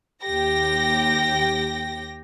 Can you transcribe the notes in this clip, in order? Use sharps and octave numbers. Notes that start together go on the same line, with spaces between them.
D#2 G4 G5 A#6